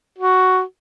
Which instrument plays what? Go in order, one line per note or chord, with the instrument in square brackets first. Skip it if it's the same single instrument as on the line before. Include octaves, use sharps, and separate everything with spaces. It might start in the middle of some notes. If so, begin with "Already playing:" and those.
[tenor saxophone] F#4